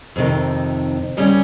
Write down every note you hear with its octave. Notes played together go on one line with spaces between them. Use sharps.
F2 C3 D#3
D#2 C#3 G3 C#4